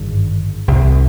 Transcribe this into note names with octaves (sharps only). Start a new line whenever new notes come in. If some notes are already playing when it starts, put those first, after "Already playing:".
Already playing: G#1 G2 D3
C2 C3